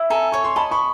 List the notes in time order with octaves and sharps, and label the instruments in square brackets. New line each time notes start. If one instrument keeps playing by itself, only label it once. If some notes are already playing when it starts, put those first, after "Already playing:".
Already playing: [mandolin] E4
[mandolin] A4 [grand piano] G#5 A#5
[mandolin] C#5 [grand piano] C#6
[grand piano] C6
[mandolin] D#5 [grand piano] A5 B5
[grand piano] B5 C#6